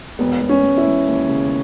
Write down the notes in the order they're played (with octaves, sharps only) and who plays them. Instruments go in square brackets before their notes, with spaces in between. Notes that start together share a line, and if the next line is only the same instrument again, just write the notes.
[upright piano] E1 [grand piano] B3
[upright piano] E1
[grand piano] C#4
[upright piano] E1
[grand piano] E4
[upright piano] E1
D#2
C#3